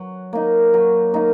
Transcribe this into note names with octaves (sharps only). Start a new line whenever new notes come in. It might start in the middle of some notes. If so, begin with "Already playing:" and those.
Already playing: F#3
A#3 D#4
F#3
A#3 D#4